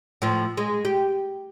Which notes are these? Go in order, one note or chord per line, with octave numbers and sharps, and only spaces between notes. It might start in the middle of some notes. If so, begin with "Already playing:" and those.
A2 F3
G#3
G4